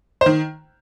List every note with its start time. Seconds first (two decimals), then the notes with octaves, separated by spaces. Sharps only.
0.21 C5
0.26 D#3